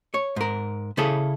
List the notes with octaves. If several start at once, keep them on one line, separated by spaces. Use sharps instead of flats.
C#5
G#2 A#4
C#3 E4 G#4 A4